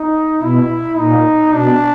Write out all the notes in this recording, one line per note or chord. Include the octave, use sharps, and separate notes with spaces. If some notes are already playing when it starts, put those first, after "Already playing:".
Already playing: D#4
B2 E4
A#2 D#4
B2 D4